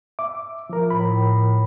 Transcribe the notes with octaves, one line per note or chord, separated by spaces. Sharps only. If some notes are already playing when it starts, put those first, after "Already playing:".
E5 D6
F3 A#4
A2 B5